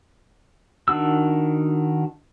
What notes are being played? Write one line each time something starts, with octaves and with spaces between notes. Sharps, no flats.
D#3 D4 F#4 E6